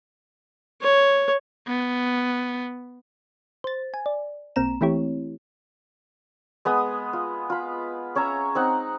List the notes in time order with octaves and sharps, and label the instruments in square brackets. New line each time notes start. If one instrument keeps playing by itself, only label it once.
[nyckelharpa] C#5
[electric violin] B3
[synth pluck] C5 A6
G#5
D5
B1 A#3 C4 A#5 E7
E3 A3 C4 E4 G4 C#5
[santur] G#3 B3 D#6
F4
F4 B5
C#4 C#5 E5 A#5
C4 D#4 F#5